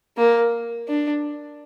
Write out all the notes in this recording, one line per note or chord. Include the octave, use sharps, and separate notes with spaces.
A#3
D4